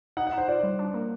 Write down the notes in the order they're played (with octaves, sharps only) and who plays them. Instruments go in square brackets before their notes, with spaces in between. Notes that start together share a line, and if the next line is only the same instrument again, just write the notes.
[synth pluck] D#4 [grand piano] F#5
[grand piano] F#5
[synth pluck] D#4
[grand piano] C5
[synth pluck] F4 [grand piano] D5
[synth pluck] G3
D4
A#3